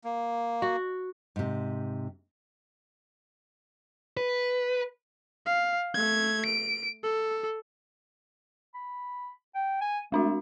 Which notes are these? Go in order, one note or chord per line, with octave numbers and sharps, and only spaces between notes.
A#3
F#4
G#2 C3
B4
F5
A3 G#6
D7
A4
B5
G5
G#5
G#3 A3 D4 F#4